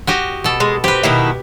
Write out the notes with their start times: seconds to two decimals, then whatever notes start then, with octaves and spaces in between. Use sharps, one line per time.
0.07 F#4 G4 D#5
0.44 B2 A4
0.60 G#3
0.84 C4 G4 B4
1.03 B2 D#3 E4